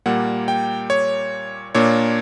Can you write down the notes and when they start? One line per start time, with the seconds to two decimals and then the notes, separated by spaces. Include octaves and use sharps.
0.06 A#2 G3 A#3 F#5
0.48 G5
0.90 C#5
1.75 A#2 A#3 D4 C#5